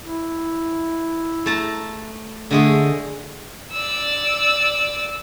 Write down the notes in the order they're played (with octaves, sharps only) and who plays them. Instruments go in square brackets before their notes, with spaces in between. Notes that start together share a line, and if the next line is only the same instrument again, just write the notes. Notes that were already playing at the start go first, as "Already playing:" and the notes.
[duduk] E4
[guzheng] A3 A5 A#5
[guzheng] D3 G#3 G#4 [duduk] A3
[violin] D5 E6